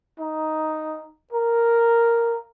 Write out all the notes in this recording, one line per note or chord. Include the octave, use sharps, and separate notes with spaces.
D#4
A#4